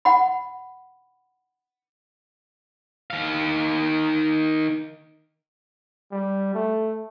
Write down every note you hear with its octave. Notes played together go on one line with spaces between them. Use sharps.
F#5 B5
D#3 F5
G3
A3